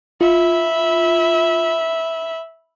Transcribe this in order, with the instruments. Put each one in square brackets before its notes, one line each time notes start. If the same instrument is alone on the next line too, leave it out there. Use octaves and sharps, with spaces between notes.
[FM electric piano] F4 [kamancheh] E5 B5